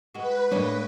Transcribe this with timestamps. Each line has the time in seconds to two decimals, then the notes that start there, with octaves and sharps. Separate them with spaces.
0.15 G#3 F#4 B4
0.51 A2 G#3 A#3 D4 C#5